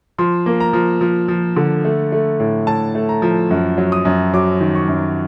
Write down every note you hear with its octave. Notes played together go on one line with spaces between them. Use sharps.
F3 C6
A#3
A#5
F3
F3
F3
D3
A3
A3
A2
A2 A5
A3
A#5
F3
F#2
F#3
D#6
F#2
F#3 D6
D#3
C#6
F#2